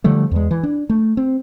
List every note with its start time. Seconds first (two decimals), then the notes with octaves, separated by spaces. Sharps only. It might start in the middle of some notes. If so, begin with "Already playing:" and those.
0.04 D3 F3 G3 A3
0.31 E2 G#3
0.51 E3
0.63 D4
0.90 A3
1.17 C4